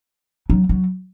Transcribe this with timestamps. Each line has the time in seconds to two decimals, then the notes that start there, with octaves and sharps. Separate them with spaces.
0.50 F#3
0.69 F#3